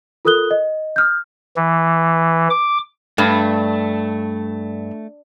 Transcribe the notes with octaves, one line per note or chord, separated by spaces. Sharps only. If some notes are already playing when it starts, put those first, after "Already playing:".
F4 A4 A#4 D#6 F#6 G7
D#5
D#6 F6 G6
E3
D6
G2 A3